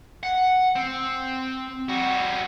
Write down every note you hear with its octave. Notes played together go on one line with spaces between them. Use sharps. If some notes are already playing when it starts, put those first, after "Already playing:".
F#5
C4
G3 F#4